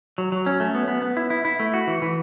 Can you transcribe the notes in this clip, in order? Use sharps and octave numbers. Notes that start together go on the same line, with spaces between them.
F#3
F#3
C#4
A3
B3
B3
B3
E4
E4
E4
A3
F#4
E3
E3